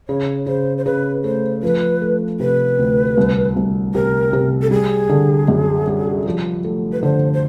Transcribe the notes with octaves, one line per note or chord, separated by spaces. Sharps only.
C#3 C#5
C#3 C5
C5
C#3 B4
A3 C5
F3 B4
A3
C3 B4
D2
C2
C2
C3 A#4
C3
A4
G3 G#4
D3
F#2
G3
F3
A3
B4
D3 C5
C5